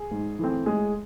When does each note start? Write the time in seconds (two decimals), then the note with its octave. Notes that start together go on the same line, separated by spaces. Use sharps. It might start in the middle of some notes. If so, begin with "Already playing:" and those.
Already playing: G#4
0.11 G#2
0.39 E3 A3 C4
0.66 A2 G#3 G#4